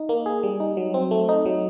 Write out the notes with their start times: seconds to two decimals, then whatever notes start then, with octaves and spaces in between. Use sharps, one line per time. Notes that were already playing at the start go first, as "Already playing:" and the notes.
Already playing: D#4
0.09 A#3
0.26 G#4
0.43 G3
0.60 D#4
0.77 F#3
0.94 C4
1.11 A3
1.29 D#4
1.46 F#3